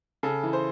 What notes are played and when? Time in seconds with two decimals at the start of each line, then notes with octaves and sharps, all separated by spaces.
0.23 C#3 A4
0.43 E3
0.53 C5